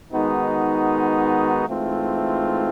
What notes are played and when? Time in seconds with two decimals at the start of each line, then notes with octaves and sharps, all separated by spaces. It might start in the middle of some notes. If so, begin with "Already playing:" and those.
0.13 D#3 G#3 B3 D#4 F#4
1.68 G#2 E3 A3 C4 F4